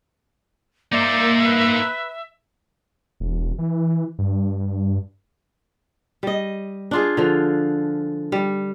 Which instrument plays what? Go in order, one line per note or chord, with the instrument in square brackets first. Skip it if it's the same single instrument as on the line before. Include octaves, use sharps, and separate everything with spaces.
[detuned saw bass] A#3 [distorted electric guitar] D#4 C5 [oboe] D5 [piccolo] E5
[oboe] B4
[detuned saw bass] E1
E3
G2
[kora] G3 D#5
D4 F4 G#4
D3 F3
G3